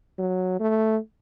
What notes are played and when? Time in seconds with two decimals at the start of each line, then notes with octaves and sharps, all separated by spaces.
0.18 F#3
0.60 A3